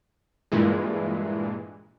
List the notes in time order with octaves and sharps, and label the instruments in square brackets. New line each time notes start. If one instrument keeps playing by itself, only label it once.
[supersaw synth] G2 A#2 E3 G#3